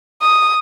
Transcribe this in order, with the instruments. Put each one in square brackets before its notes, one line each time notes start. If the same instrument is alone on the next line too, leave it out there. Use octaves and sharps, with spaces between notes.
[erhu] D#6